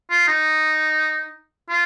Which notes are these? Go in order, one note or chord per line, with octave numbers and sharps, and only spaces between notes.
F4
D#4
F4